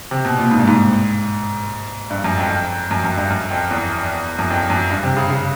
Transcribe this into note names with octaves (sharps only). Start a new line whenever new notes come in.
C3
B2
A#2
G#2
G2
G#2
G2
F#2
F2
F2
F#2
F#2
G2
F#2
F2
E2
F#2
F2
F#2
G2
C3
C#3
C#3